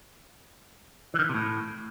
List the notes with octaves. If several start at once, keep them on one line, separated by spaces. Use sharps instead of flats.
E3
D#3
E3
C3
A2